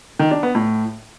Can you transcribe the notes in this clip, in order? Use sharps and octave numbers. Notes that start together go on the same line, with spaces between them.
D#3
D4
B3
A2